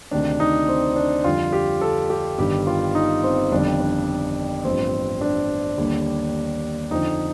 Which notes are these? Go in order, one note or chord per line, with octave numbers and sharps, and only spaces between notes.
D2 C3 D#3 D4
D#4
C4
D4
F2 D3 G3 F4
G4
A4
G4
G1 G2 D#3 G4
F4
D#4
C4
G1 F2 D#3 G3 D4
D4
A1 G2 F3 C4
D4
D#2 D3 G3
F2 D3 F3 D#4